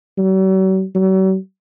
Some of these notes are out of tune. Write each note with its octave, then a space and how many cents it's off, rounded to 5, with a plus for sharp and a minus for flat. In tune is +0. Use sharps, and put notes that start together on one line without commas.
F#3 +45
F#3 +45